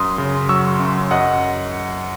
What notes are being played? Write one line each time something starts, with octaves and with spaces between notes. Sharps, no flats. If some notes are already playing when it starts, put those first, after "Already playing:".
Already playing: F#2 C6 D#6
C#3
F#3 C#6 E6
F#2
F#2 D#5 F#5